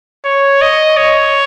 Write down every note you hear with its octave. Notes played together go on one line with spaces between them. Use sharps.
C#5
D#5
C#5